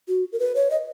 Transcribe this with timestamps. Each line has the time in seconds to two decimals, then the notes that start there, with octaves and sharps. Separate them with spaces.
0.08 F#4
0.33 A#4
0.39 B4
0.55 C#5
0.71 D#5